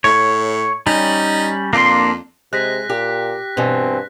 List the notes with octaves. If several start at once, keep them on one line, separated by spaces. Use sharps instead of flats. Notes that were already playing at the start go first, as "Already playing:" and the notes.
A2 C#5
G3 C#4 D#4
F2 A#3 D4 C6
C3 G#3 F#6 A#6 B6
A#2 G4
G2 B2 E3 C4